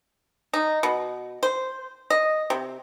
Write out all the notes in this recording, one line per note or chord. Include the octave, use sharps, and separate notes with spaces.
D#4
B2
C5
D#5
C3